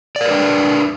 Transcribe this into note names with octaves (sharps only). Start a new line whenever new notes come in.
D4 A#4 B4 D5